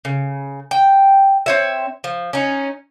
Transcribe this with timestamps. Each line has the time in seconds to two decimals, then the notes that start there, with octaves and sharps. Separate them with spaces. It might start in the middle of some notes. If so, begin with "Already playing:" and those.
0.05 C#3
0.71 G5
1.46 C4 C#5 E5
2.04 F3
2.33 C#4 D#4